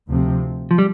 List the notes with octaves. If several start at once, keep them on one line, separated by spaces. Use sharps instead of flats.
D2 C3 F3 C4
F3
G3